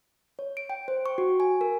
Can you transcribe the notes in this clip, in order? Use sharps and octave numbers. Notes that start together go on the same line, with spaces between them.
C#5
D7
G5
C5
C#6
F#4
G#5
A#4